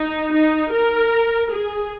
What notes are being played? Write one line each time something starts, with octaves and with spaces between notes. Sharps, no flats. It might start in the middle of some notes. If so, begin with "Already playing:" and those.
Already playing: D#4
D#4
A#4
G#4